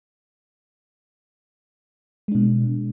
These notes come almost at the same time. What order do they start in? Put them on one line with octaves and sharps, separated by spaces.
G#3 D4 B2